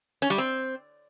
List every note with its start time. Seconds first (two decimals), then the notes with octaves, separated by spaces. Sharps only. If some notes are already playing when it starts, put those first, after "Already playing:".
0.22 C#4
0.30 G3
0.38 C4